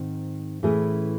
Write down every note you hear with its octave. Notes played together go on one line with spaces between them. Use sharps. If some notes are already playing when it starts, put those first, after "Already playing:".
Already playing: G#2 D#3 C4
A2 E3 A3 C#4 G#4